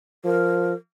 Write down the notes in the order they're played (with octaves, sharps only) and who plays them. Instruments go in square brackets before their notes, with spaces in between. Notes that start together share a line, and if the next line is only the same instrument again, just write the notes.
[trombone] F3 [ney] A#4